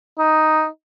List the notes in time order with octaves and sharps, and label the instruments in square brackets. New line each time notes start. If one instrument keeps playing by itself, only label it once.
[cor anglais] D#4